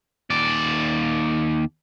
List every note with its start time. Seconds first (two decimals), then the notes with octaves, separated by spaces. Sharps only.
0.30 D#2 D5